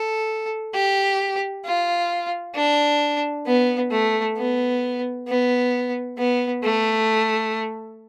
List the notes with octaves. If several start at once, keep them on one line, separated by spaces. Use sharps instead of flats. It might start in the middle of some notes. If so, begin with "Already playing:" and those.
Already playing: A4
G4
F4
D4
B3
A3
B3
B3
B3
A3